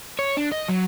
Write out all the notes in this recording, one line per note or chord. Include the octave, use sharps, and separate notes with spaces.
C#5
D4
D#5
F#3